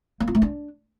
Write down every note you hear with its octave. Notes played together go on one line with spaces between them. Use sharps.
A#3
F4
A3
D4